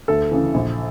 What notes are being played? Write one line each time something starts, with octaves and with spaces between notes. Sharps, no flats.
D2 A4
C#3 E3
A#1